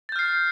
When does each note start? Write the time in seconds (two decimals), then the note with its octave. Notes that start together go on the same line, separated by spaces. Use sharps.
0.09 A6
0.12 G6
0.16 F6
0.19 C7